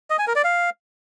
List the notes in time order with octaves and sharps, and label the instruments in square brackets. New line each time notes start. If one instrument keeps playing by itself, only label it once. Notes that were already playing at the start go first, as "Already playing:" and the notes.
[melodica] D#5
G#5
A#4
D5
F5